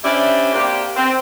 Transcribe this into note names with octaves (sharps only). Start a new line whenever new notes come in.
C#4 D4 E4 G4 C5 D5
A#3 C4 D4 G4
C4